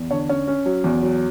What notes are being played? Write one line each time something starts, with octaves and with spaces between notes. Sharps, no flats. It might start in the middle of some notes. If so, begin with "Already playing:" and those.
Already playing: E2
D3 C#5
C#4 C#5
C#4
F#3
E2
F#3